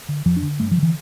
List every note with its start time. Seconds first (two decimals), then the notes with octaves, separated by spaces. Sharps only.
0.09 D3
0.25 F2 F3
0.37 D4
0.43 D3
0.59 G2 A3
0.71 F3
0.77 D3
0.83 E3